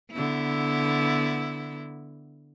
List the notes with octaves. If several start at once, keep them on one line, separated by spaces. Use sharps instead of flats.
D3 B3 E4